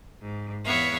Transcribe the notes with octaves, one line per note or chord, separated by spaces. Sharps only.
G#2
E2 B3 C#5 E5 F5